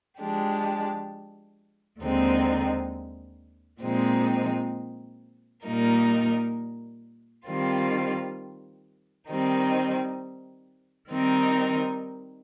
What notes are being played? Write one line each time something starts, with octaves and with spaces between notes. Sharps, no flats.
F3 G#3 D4 G4
D#2 D3 G#3 C4 D#4
A#2 F3 G#3 C4 D#4
A#2 G3 A#3 D#4 A#4
D#3 G3 C4 F4
D#3 G3 C4 D#4
D#3 G3 C4 D#4 A#4